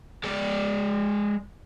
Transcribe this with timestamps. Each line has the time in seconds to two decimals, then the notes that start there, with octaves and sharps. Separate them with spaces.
0.24 G#3 D5